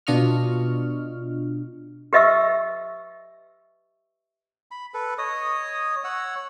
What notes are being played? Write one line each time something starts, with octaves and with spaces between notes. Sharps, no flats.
B2 D4 F4 D#5 C#6 F6
G4 B4 D#5 E5 C#6 E6
B5
A4 B4
C#5 D#5 D#6
C#5 F#5 E6